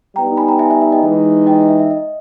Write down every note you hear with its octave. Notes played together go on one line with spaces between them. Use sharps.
G3 B3 D#4 G5 A#5
G#5 B5
G5 A#5
E5 G#5
E5 G#5
E5
D#5 G5
E3 G#3 D#4 D#5
D#5 G5
E5
E5
D#5